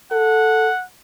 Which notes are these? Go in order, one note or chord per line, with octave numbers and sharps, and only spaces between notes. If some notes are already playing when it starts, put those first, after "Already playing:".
A4 F#5